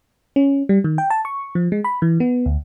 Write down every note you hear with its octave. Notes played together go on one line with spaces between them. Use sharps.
C#4
G3
D#3
G5
A5
C#6
F3
G#3
B5
E3
B3
D2